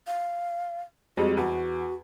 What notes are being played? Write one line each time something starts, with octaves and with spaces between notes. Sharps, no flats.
F5
F2 G3 G#3 F#4
E2 F#4